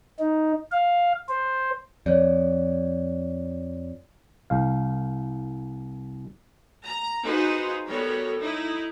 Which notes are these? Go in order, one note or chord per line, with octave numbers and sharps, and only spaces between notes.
D#4
F5
C5
F2 C#5 D5
C2 F5
A#5
D#4 F4 F#4 G#4 B4 C5
G3 B3 F#4 A4 A#4 C#5
D#4 E4